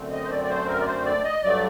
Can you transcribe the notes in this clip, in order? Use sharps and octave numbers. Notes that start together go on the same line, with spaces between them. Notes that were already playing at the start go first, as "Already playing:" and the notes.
Already playing: F#2 D3 A3 C4
D#5
C5
D5
D5
C5
A#4
D5
C5
D5
D#5
G2 F#3 A3 D5